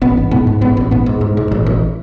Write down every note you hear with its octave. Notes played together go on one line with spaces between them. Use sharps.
A1 B3
G#2
G#2 B3
G#2
A1 B3
A1
G#2 B3
G#2
G#2
G#2
A1
A1